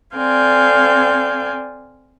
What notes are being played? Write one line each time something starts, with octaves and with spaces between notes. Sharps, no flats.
C4 A4 D5 F5 G#5 G6